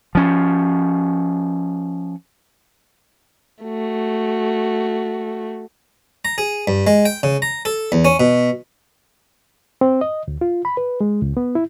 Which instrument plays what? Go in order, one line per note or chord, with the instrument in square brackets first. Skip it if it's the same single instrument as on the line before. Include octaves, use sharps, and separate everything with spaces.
[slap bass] F3 C#4
[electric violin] A3 F#4
[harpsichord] A#5
G#4
G2
G#3
G5
C#3
A#5
A4
E2
C#4
B2
[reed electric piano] C4
D#5
D2
F4
B5
B4
G#3
C#2
B3
E4